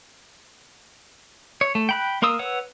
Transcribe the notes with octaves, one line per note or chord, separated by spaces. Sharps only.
C#5
A3
G5 B5 F#6
A#3 A#4 C6 D#6 E6
B4 C#5 F#5 E6